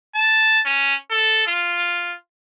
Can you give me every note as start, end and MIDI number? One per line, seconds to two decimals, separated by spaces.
0.15 0.60 81
0.65 0.95 61
1.10 1.44 69
1.47 2.14 65